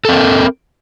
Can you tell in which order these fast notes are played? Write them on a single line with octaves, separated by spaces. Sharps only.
A4 C4 A#4